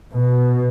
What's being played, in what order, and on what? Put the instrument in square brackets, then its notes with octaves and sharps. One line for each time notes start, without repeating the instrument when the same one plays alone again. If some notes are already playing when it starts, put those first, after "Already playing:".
[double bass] B2